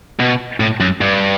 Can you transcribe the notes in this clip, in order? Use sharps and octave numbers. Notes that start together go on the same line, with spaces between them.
B2
A2
F#2
G2